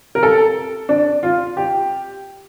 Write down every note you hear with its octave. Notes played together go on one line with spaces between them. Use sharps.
A#4
A4
D4
F4
G4